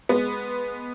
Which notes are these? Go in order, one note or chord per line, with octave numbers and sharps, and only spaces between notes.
G#3 B3